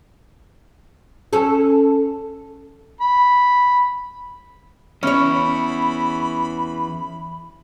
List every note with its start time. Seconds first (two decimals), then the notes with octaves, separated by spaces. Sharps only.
1.33 C#4 A4
3.01 B5
5.03 E2 C#4 E4 C#5 B5